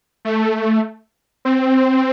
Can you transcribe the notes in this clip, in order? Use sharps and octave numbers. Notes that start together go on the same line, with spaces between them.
A3
C4